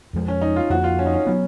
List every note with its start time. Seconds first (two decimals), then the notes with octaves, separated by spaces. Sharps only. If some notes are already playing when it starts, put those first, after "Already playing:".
0.13 F2 F3 G#3
0.28 C#4
0.41 D#4
0.56 F4
0.70 F2 F3 A#3 F#4
0.84 F4
0.99 C#4
1.06 D#4
1.14 C#4
1.27 F#3 B3